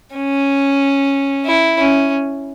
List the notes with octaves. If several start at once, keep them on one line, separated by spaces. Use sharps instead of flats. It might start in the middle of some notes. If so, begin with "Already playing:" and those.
C#4
E4
C#4